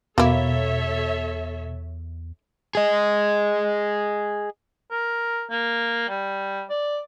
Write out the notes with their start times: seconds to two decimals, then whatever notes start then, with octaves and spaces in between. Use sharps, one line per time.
0.18 E2 B2 A#3 E4 A4 C#5 E5
2.75 G#4 D#5
4.91 A#4
5.51 A#3
6.09 G3
6.70 D5